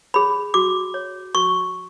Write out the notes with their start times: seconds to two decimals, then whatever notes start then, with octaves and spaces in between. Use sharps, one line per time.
0.14 G#4 C#5 B5
0.54 F#4 D6
0.94 C#5
1.35 F#4 C#6